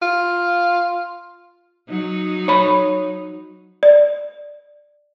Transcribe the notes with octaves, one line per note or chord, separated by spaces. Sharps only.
F4
F#3 D#4
C#5 B5
D5